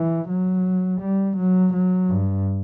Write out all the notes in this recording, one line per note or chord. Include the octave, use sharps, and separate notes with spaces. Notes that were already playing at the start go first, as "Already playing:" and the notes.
Already playing: E3
F#3
G3
F#3
F#3
G2